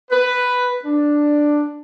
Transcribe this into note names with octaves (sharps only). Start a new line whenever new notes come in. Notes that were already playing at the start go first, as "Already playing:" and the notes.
B4
D4